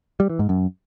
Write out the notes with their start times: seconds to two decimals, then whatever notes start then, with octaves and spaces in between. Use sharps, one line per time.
0.20 G3
0.30 E3
0.39 G#2
0.49 F#2